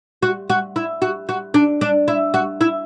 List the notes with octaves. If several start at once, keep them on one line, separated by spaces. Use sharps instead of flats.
F#4
F#4
E4
F#4
F#4
D4
D4
E4
F#4
E4